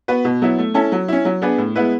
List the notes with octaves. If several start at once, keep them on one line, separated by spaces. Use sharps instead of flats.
B3 F#4 B4
B2
F#3 B3 E4
A3
C#4 E4 A4
F#3
C#4 E4
F#3
B3 D4 G#4 B4
A2
G#3 B3 E4 B4